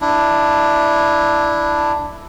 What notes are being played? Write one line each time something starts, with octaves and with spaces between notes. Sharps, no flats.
D4 E4